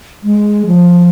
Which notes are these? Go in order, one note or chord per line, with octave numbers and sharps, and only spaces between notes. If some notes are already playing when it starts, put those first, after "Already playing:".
G#3
F3